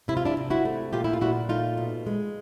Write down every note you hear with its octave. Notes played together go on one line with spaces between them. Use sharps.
C3 E4
F4
D4 E4
C3
E4 F#4
A3
A#2 F4 G4
E4
F4
A#2 E4 F#4
A3 D#4 F4
B2
G#3